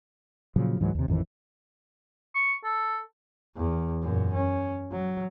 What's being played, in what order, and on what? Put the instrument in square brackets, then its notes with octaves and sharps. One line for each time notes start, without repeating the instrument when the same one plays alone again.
[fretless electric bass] A#2 C#3 F3 F#3
C#2 G#2 E3 F#3
D#2 C3
A1 F2 D#3 E3
[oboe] C#6
A4
[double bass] E2
F#2 A#2
C#4
F#3